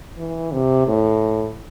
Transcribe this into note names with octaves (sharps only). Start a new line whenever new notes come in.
E3
C3
A2